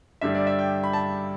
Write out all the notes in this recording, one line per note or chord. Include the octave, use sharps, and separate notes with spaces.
G2 D3 G3 E5
D5
E5
G5
B5
A5